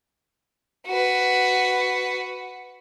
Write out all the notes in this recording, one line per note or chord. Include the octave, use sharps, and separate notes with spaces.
F#4 B4